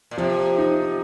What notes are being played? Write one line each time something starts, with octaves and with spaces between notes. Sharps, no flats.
A#2
C3 F3
D#4